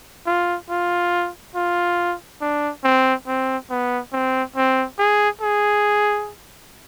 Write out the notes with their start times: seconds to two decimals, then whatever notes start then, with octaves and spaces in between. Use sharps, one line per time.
0.27 F4
0.70 F4
1.55 F4
2.41 D4
2.84 C4
3.27 C4
3.70 B3
4.13 C4
4.56 C4
4.99 G#4
5.42 G#4